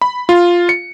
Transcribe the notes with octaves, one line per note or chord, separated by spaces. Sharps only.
B5
F4
C#7